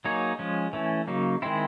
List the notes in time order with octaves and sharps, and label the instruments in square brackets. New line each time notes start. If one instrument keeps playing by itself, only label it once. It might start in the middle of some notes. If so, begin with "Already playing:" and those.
[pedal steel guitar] F#3 A#3 D#4 G#4 C#5
F3 G#3 C#4
E3 A3 C#4
C#3 F#3 A#3 D#4
D#3 G#3 C4 E4